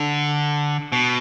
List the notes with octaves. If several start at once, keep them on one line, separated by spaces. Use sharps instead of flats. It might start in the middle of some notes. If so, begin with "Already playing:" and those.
Already playing: D3
B2